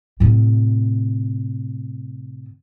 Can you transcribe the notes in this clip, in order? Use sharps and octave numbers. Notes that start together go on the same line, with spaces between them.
A2 C3